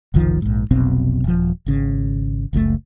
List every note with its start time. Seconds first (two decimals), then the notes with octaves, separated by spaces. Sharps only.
0.14 F#1 C2 D#3 F3
0.42 A#1 G#2
0.71 F1 B1 B2 C4
1.24 D#1 F3
1.66 G#1 C#3
2.53 F#1 C#2 A#2 A3